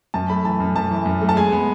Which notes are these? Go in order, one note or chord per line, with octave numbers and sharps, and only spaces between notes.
F#2 A5
A3 B5
E3 A5
F#2
F#2 A5
E3
F#2
A3
A5
G#3 G#5
B3